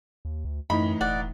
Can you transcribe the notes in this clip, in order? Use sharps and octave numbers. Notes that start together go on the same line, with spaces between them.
D#2
D2
F#2 A2 E3 D#4 B5
E1 D5 F#5